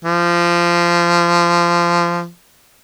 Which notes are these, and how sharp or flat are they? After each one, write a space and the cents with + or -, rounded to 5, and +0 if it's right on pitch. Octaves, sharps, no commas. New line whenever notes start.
F3 -20